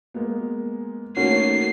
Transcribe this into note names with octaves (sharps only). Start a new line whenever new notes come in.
G#3 A#3 B3
D#3 A3 A#3 C#4 F#4 C7